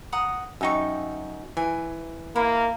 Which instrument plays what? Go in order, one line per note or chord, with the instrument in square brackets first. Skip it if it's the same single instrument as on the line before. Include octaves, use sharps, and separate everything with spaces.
[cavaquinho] F#5 A#5 D#6
[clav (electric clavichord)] F#2 D#4 [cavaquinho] E5 G5 C#6
[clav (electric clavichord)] E3 [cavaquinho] G#5
[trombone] A#3 [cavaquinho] E4